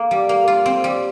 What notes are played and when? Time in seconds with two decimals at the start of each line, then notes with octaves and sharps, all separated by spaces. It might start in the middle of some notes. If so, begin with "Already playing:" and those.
Already playing: A#3
0.11 G3
0.29 A#3
0.48 F4
0.66 C4
0.84 G3